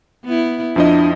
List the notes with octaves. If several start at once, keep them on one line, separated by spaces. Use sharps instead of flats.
B3 E4
F2 F3 D4 E4 D#5